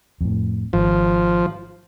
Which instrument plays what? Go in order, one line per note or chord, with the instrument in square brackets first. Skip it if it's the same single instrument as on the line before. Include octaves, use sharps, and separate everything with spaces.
[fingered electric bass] F2 A2
[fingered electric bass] G#1 [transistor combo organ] F3